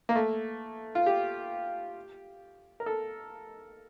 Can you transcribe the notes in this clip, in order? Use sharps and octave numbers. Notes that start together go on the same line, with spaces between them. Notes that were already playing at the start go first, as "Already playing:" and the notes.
A#3
A3
F4
G4
A#4
A4